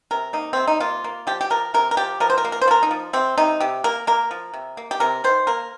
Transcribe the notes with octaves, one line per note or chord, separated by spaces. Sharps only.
C3 A#4
A#3 D#4
C3 C4
D#4
A#3 F4
A#3
F3 G4
G4
F3 A#4
C3 A#4
A#4
F3 G4
F3 A#4
C5
A#4
A#3
A#4
C5
F3 A#4
D#4
F3
C3 C4
C3 D#4
C3 G4
A#3 A#4
A#3 A#4
F3
C3
A#3
G4
C3 A#4
D#3 C5
A#3 A#4